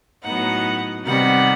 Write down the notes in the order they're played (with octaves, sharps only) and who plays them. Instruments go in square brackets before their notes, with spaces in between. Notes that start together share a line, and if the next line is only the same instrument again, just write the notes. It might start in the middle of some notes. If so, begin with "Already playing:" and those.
[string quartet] A2 F#3 B3 D#4 F#5
C3 D#3 G3 B3 F#5